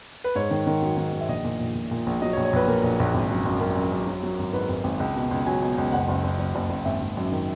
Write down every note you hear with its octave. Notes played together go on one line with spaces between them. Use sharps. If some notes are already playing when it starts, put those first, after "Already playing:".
B4
G#2 C#5
D#3
D#3
F#3
D#3
D#3
E5
A#1 D#5
A#2
A#1
A#2
A#2
A#1
F#3 D#5
C#5
A#1
C#5
A#1 B4
A#2 A#4
A#1
A#1
G#1
F#2
F#2
F#2 A#4
F#2
F#2
F#3
F#3
G#1
G#2 B4
G#1
G#1
C#2
B2
C#2
F#3 G#5
B2
C#2
F#1 F#5
F#1
F#1
F#1
F#1
F#1
G#1 E5
G#1
F#2
D#3